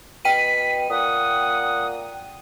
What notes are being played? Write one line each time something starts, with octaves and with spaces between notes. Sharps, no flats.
B2 G5 B6 D#7
A#2 F#5 D#6